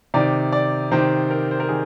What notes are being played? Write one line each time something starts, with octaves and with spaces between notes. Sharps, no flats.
C3 D#3 D5
D5
C3 D#3 C5
A#4
C5
A#4
D#3 G#4